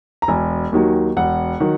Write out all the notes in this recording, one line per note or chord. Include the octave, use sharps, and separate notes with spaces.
A#5
E1 G#5
D#2 D#3 F#3
E1 F#5
D#3 F#3